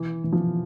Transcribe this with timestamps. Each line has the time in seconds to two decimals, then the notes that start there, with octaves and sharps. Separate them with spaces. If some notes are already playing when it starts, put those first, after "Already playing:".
Already playing: E3
0.24 E3
0.33 F3